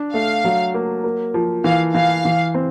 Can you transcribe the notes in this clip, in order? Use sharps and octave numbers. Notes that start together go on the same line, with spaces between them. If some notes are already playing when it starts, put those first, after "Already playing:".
Already playing: D4
A3 F5
F#3
A#3
A#3
F3
E3 F5
E3 F5
E3
C4